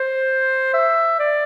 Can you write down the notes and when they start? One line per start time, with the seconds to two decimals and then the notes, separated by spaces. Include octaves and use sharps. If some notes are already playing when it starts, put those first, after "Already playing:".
Already playing: C5
0.73 E5
1.19 D5